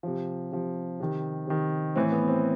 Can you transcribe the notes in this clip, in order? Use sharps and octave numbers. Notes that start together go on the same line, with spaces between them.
C3 F3
C3 F3
C3 D#3
C3 D#3
A2 E3 C4
B3
C4